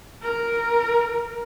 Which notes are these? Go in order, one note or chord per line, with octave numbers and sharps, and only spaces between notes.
A#4